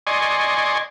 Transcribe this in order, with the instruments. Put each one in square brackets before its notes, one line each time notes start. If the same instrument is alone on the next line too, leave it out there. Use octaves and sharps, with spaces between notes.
[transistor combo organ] D5 D#5 G#5 C6 C#6